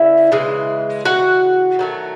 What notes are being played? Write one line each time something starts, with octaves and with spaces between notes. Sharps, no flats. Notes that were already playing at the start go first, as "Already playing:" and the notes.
Already playing: C#3 A#3 D4 E4 E5
C#3 E3 G#3
F#4 F#5
D#3 F#3 A3